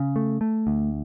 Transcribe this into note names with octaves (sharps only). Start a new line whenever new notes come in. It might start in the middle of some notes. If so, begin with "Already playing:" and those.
Already playing: C#3
A3
A3
D2